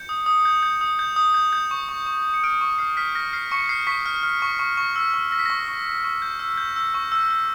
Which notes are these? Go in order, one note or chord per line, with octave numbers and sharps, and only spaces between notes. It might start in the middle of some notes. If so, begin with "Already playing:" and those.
Already playing: G6 C#7
D#6
D#6
G6
G6
D#6
G6
D#6
G6
G6
C#6
C#6
C#6
C#6
C#7
F6 D7
C#6
F6 C7
F6 B6
F6 A#6
F6 C7
C#6 C#7
F6 C7
C#6 B6
F6
F6
C#6
C#6
C#6
E6
C#6
E6 A#6
B6
C#6 A#6
C#6
C#6
C#6
G6
E6
G6
E6
C#6
E6
E6